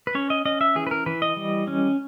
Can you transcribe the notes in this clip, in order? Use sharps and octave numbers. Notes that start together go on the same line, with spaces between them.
B4
C#4 C#5
D#5
C#4 D#5
E5
E3 G#4
B4
A#4
E3 B4
D#5
G3
C#4